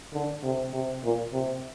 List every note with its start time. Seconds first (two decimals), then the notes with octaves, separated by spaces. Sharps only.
0.13 D3
0.43 C3
0.73 C3
1.03 A#2
1.33 C3